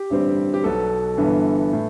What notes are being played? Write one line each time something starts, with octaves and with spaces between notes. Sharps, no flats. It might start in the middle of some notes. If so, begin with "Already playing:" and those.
Already playing: G4
A1 G2 D3 G3 C4
G4
B1 B2 B3 A4
G1 G2 E3 B3
A2